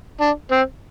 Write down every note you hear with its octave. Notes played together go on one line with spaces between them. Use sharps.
D4
C4